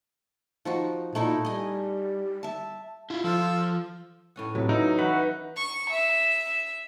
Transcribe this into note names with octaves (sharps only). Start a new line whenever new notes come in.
F3 D#4 F#4
A#2 A3 D#4 E4
G3 D#5 G#5
E5 A5
E4 F4
F3 F4 A4 E6
A2 C#4 F#5
A2 C3 F#3 B3
F#3 D#4 E4
E3 F#4 F#5 B5
C#6
E5